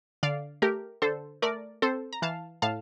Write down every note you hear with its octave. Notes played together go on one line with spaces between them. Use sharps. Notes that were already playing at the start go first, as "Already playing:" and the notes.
D3 D5 F5
A3 G4 A#4
D3 A4 C5
A3 A#4 D5
C4 A4 C5
A#5
E3 F5 A5
A2 F5 A5